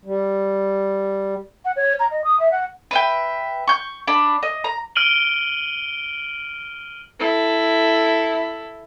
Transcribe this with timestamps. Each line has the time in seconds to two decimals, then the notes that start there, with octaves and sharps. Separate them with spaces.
0.05 G3
1.65 F#5
1.76 C#5
2.00 A#5
2.11 D#5
2.24 D#6
2.40 E5
2.51 F#5
2.91 B4 E5 G5
3.68 C#6 G6
4.08 D4 B5
4.43 D#5
4.64 A#5
4.96 F6 D7 D#7 F#7 G7
7.19 E4 A4